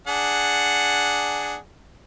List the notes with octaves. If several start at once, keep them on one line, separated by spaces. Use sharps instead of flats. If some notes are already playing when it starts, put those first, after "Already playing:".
D4 G#4 F#5